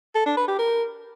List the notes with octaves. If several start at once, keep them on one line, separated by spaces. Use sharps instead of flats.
A4
D4
B4
G4
A#4